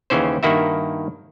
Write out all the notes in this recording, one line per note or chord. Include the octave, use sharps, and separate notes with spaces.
D#2 C#3 E3 C#4 C5
G2 D#3 A#3 E4 F#4 E5